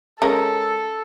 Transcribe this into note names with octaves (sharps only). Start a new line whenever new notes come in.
G#3 C#4 A4 A#4